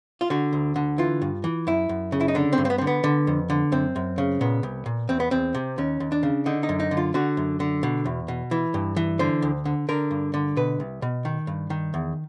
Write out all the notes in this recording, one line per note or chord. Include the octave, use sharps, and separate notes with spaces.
F4
D3 F#4
D2
D3
E3 F4
G2
E3
F#2 E4
F#2
C#3
E4
D#4
D3 D4
C4
G2
C4
B3
D3 C4
B3
D3
F2
D3
F#2 C4
F#2
C#3
A#2 B3
C2
A#2
E2 C4
B3
E2 C4
C3
D#2 C#4
D#2
D4
C#3
D3 D#4
D#4
F#2
D#4
D3
F4
D3 F#4
F#2
D3
B2
E2
B2
E3
G2
E3
D3 C5
D2
D3
D3 A#4
G2
D3
B2 B4
C2
B2
D#3
G2
D#3
E2